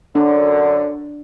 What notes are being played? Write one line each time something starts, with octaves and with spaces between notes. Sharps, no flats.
F#2 D3 D4